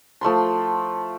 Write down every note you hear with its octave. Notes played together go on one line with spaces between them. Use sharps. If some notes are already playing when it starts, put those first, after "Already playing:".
F3 A3 B5 C6